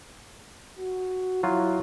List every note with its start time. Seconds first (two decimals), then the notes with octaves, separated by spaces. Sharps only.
0.79 F#4
1.43 F#3 E4 F4